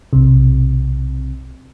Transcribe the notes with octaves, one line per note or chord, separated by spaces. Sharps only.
B1 C3